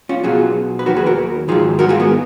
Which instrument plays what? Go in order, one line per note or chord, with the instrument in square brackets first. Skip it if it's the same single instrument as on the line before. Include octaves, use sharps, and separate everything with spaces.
[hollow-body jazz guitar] C#4 F4
B1 B2 F#3 F4 G#4
B4
D#2 D#3 F#3 F#4 A#4
G#4 B4
F#4 A#4
G#2 D#3 F#3 F4 G#4
F#4 A#4
F4 G#4
G#3 B3